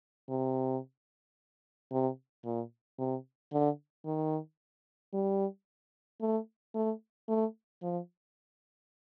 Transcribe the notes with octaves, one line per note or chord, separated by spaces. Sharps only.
C3
C3
A#2
C3
D3
D#3
G3
A3
A3
A3
F3